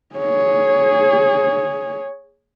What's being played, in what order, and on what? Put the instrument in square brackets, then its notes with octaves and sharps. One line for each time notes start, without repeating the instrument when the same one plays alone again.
[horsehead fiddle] G#4 C#5